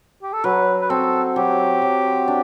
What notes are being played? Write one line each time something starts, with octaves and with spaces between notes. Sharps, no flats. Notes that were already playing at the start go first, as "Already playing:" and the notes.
G4
A4
F#3 B4
B4
C4 A4
F#3 G4
F#3
D4